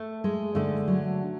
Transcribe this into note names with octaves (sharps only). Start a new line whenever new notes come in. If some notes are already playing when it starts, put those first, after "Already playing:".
Already playing: A3
G#3
D3 A3
F#3